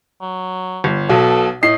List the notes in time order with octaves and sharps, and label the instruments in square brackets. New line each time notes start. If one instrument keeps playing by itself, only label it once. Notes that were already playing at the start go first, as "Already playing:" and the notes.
[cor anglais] F#3
[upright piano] G1
[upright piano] B1 B2 [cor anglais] A4
[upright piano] A2 C7 [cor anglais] D#5